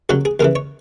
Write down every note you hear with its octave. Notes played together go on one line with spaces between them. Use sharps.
D#2 C#3 F#3 F#4
G#4
D#2 C#3 E3 A#4
C#5